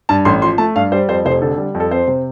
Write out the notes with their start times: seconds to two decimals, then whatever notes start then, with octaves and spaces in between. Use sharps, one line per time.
0.09 G2 A5
0.25 A1 C6
0.42 F3 C6
0.58 A3 A5
0.76 G2 F5
0.92 G3 C5
1.08 F2 C5
1.25 F1 C5
1.42 D3 A4
1.58 G3
1.75 F2
1.80 A4
1.91 C4 C5
2.08 C3